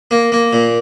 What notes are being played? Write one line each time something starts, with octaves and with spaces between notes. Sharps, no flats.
A#3
A#3
A#2